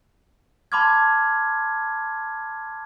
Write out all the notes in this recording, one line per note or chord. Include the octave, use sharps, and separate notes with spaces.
A5 B5 C6 D6 F6 G#6